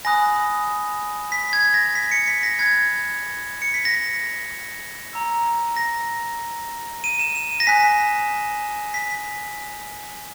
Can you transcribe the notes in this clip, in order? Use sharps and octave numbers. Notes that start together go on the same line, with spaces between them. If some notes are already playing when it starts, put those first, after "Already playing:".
G#5 B5 D#6 F#6 A#6
B6
G#6
A#6
B6
C#7
B6
A#6
B5 F#6 G#6
C#7
B6
A#6
A#5 E6
A#6
D#7
E7
E7
D#7
A#6
G#5 D#6 F#6 B6
B6